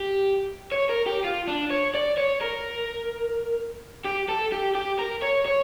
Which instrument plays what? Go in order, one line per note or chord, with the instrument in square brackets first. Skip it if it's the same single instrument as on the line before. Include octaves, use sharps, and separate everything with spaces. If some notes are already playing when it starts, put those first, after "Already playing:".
Already playing: [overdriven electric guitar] G4
C#5
A#4
G4
F4
D4
C#5
D5
C#5
A#4
G4
A4
G4
G4
A#4
C#5
C#5